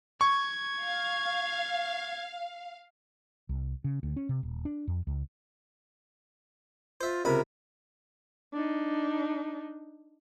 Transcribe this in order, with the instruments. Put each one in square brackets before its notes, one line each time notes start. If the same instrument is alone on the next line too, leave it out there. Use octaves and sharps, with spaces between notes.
[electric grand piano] C#6 [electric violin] G#6
[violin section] F5
[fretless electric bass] C2
C#3
D2
C#4
C3
D#1
D4
F2
C#2
[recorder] F4 [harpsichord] C5 E5
[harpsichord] C#2 C3 B5 [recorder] A#4
[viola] D4 D#4